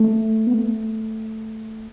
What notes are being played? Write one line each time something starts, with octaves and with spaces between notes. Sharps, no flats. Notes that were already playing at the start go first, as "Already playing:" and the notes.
Already playing: A3
B3
A3